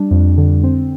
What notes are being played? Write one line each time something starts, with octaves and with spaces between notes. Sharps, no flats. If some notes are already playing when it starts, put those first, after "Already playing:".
Already playing: G3 D4
F2
D3
C4